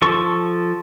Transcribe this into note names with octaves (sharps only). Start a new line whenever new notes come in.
F3 A4 C#6